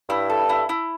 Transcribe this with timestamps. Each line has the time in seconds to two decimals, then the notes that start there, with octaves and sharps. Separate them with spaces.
0.09 G2 E4
0.30 A4
0.49 E4
0.69 E4